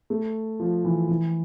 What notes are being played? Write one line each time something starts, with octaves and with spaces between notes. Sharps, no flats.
A3
F3
E3
E3